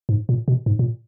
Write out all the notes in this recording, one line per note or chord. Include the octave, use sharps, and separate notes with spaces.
G#2
A#2
B2
G#2
A#2